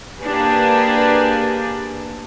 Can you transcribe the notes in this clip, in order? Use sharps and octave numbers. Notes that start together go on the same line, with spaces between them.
A#3 D4 G4 G#4 B4